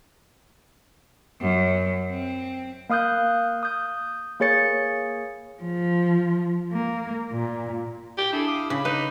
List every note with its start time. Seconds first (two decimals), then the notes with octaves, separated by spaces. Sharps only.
1.41 F#2
2.10 C4
2.90 A#3 F5 D#6 F#6 G6
3.63 D#6 G6
4.40 A#3 G#4 C#5 A6 C#7
5.63 F3
6.72 A#3
7.32 A#2
8.18 G4
8.33 D4 E4 G#4 A4
8.48 F5 D6 D#6
8.70 C#3 B5
8.85 D#4 B4